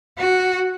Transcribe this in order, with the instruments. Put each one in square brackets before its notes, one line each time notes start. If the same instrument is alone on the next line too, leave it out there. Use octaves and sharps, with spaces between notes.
[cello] F#4